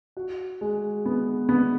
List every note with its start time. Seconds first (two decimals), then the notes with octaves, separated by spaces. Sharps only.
0.17 F#4
0.61 G#3
1.06 B3
1.49 B3